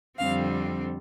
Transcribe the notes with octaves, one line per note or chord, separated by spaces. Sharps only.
F2 D3 G3 C4 F5